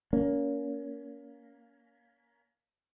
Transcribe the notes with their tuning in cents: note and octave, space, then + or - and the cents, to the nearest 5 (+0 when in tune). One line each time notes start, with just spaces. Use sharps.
A#3 +10 C#4 +30